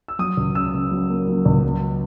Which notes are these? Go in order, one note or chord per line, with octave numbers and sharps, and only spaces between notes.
E6
F#3 D#6
C#2
C#3 E6
C#3
F#3
A#3
F#3
C#2
F#3